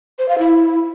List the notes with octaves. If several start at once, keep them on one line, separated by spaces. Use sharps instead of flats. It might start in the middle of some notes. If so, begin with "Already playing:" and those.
C5
F5
E4